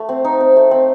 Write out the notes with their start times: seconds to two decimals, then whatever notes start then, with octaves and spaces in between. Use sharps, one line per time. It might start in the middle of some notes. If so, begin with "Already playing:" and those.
Already playing: A3
0.09 C4
0.24 D#4
0.40 C4
0.56 A3
0.71 C4